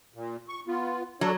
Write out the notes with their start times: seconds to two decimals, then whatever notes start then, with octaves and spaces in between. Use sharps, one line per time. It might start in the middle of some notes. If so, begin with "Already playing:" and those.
0.14 A#2
0.49 C#6
0.67 B3 F4
1.21 F#3 D4 A4 C#5